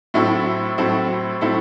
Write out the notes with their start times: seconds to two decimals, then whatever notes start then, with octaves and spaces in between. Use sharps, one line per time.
0.14 A2 F#3 C4 E4 A4
0.78 A2 F#3 C4 E4 A4
1.41 A2 F#3 C4 E4 A4